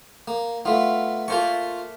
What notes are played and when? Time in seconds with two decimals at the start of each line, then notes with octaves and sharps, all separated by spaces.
0.28 A#3
0.65 A3 B3 F4
1.28 A3 A#3 F4 C5 C#6